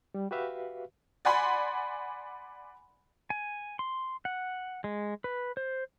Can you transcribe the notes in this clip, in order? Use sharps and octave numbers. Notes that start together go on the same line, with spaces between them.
G3
F#4 G4 B4 E5 F5
D5 F#5 G#5 B5 C6
G#5
C6
F#5
G#3
B4
C5